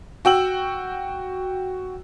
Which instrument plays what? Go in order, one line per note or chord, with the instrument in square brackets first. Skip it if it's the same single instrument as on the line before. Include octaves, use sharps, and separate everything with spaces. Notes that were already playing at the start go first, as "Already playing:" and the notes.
[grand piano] F#4 G5 E6 F#7